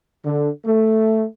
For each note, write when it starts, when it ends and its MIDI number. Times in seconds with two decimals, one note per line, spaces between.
0.24 0.49 50
0.65 1.24 57